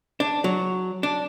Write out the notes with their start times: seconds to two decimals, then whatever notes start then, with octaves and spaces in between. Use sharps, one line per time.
0.20 D4
0.44 F#3
1.03 D4